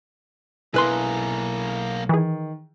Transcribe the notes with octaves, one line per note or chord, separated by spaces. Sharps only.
B1 A#3 E4 G#4 B4 C6
D#3 E3 G#4